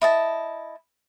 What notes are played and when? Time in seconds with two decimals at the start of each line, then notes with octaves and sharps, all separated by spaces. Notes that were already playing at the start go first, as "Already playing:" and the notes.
0.02 E4 D#5 A5